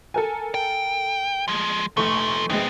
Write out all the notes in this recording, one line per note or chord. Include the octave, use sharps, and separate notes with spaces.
A4 A#4 G#5
G5
F3 G#3
F1 A#2 F3 A3 C#6
A#1 G#3 B3 C4